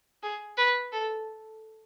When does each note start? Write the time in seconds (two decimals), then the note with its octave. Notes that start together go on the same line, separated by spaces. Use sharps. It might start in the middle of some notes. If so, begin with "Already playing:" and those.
0.23 G#4
0.58 B4
0.92 A4